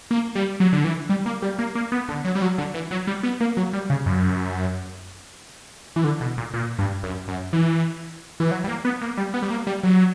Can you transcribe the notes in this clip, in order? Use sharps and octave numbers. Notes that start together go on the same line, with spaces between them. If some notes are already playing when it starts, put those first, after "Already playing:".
A#3
G3
F#3
D3
E3
G3
A#3
G3
A#3
A#3
B3
D3
F#3
G3
F#3
D3
E3
F#3
G3
B3
A#3
F#3
G3
C#3
F#2
E3
D3
B2
A#2
A#2
G2
F#2
F#2
E3
E3
F#3
G3
A#3
B3
A#3
G3
B3
G3
A#3
G3
F#3